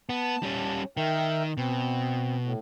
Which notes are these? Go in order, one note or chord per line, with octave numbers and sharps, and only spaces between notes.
B3 A5
G3 C#4
D#3 A#4 E5 G5
B2 C4
A2